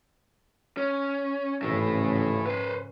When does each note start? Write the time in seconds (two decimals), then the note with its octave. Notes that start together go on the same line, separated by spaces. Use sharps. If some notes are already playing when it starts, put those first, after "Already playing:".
0.77 C#4
1.62 A1 F2 G#2 C#3 A3 E4
2.45 B4 C5